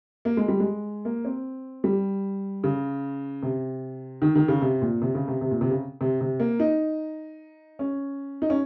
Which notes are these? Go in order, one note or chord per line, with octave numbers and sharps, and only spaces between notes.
A#3
G#3
G3
G#3
A#3
C4
G3
C#3
C3
D#3
D#3
C#3
C3
A#2
C3
C#3
C3
C3
A#2
C3
C#3
C3
C3
A#3
D#4
C#4
D#4
C#4